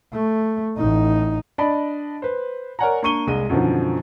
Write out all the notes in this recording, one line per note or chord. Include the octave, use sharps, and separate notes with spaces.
A3
A1 D#4
D4 D5 D#5 A5 B5
B4 C5
A#4 C#5 D5 F#5 G#5 A#5
A#3 D4 C#6 D#7 G7
C2 G#3 D#7
F#2 B2 D3 D#3 F3